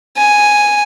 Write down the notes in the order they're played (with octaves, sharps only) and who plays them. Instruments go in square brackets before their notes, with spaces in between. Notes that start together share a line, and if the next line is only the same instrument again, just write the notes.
[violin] G#5